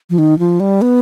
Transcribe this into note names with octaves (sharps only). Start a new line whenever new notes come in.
F3
D#3
F3
G3
B3